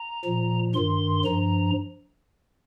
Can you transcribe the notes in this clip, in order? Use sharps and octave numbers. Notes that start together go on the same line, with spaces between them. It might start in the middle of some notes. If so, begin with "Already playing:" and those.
Already playing: A#5
A#2 F3
G2 D#3 C6
G2 F3 A#5